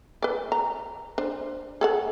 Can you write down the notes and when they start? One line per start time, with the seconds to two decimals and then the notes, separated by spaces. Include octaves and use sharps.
0.22 B4 D5
0.52 A#5
1.18 D4 C5
1.81 G#4 A4 F#5